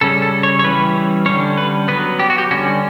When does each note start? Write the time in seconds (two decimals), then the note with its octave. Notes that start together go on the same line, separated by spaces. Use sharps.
0.01 C#3 G3 C#4 A4
0.22 A4
0.43 C#5
0.59 C#5
0.64 E3 G3 C#4 B4
1.26 D3 G3 C#4 C#5
1.57 B4
1.88 F#3 B3 B4
2.19 G4
2.30 F#4
2.38 G4
2.51 D3 G3 C#4 F#4